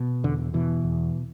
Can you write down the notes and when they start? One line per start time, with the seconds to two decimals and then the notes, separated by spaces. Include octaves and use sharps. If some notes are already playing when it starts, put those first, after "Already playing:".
Already playing: B2
0.24 E2 D3
0.53 B2 E3
0.84 E2